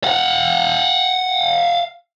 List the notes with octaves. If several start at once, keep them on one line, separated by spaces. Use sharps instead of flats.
F5 F#5